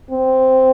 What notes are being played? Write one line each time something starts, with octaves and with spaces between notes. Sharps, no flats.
C4